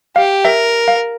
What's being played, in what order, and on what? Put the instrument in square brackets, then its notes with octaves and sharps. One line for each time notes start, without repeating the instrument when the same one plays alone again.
[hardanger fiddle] G4 [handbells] F5
[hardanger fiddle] A#4 [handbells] E5
[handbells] F5